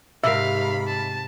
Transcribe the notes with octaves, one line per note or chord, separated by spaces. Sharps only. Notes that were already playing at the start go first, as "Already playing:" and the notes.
G#2 C3 A#4 E5 F5 B5
A5